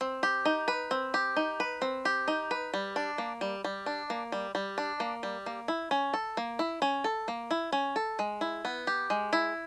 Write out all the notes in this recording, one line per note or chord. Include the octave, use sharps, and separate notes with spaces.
C4
G4
D#4
B4
C4
G4
D#4
B4
C4
G4
D#4
B4
G3
D4
A#3
G3
G3
D4
A#3
G3
G3
D4
A#3
G3
A#3
E4
C#4
A4
A#3
E4
C#4
A4
A#3
E4
C#4
A4
G#3
E4
B3
G4
G#3
E4